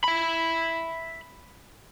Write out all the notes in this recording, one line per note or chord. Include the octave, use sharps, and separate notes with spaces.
E5 B5